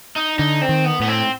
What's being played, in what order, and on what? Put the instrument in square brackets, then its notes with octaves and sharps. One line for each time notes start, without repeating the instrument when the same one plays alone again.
[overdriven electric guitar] D#4
[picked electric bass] D3 [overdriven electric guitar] D#4
[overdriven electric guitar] C4
[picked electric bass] D#3
[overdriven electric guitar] B3
[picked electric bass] A2 [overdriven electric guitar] B3
[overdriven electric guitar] C4